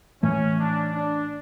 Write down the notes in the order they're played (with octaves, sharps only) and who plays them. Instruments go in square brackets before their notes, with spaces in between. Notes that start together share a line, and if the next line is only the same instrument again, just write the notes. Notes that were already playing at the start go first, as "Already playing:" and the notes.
[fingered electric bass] A2 E3 A3 [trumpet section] C#4
[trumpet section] D4
D4